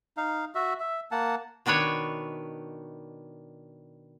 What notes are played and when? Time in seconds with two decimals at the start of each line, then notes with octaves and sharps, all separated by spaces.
0.17 D#4 F5
0.55 F#4 E5
0.80 E5
1.11 A#3 F#5 A5
1.66 B2 D#3 D4 B4 C#5